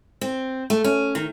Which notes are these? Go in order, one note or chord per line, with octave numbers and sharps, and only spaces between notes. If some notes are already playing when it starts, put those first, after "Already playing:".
C4
A3
C#4
D#3